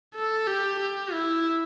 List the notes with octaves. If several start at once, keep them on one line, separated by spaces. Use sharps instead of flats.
A4
G4
G4
E4